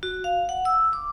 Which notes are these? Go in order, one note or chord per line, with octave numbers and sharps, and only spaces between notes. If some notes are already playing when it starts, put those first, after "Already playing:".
F#4
F5
F#5
E6
D6